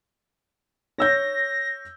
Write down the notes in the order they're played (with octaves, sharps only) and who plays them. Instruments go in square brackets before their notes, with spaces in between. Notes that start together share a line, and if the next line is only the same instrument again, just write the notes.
[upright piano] C#5 E6 G6 [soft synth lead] A#6